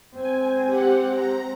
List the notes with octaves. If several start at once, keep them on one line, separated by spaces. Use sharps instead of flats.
G#3 C4 G#5
G4 F#5
A#5